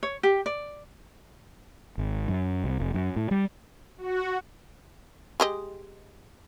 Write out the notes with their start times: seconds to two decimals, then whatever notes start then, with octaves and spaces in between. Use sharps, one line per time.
0.03 C#5
0.23 G4
0.46 D5
1.98 G#1
2.28 F#2
2.64 C2
2.80 F1
2.94 F#2
3.16 A2
3.31 G3
3.98 F#4
5.40 G#3 G4 D#5